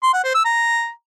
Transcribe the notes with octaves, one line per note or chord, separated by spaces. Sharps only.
C6
F#5
C5
E6
A#5